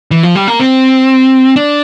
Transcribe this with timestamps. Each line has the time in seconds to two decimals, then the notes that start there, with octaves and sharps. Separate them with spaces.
0.11 E3
0.23 F3
0.35 G3
0.47 A#3
0.60 C4
1.56 D4